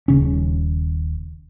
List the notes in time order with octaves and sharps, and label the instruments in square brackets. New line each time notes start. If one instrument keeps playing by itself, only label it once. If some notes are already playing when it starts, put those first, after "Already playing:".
[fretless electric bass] D#1 C#3 C#4